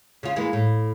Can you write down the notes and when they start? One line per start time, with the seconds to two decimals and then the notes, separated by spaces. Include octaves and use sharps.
0.23 C#3 F4
0.36 E3 G#3 A#3
0.53 A2